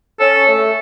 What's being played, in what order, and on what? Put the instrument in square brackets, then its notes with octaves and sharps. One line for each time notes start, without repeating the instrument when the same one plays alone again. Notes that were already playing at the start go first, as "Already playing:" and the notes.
[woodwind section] C#4 [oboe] A4
[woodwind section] A3